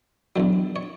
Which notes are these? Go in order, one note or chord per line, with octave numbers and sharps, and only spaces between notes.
E2 D3 F#3
C#5